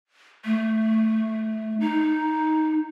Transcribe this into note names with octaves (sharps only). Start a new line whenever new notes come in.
A3
D#4